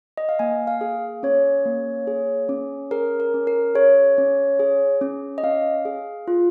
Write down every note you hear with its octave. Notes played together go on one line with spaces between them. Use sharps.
D#5
F5
A#3 G#5
F5
G#4
C#4 C#5
A#3
G#4
C#4
G#4 A#4
A#4
C#4
A#4
G#4 C#5
C#4
G#4
C#4
D#5
C#4 F5
G#4
F4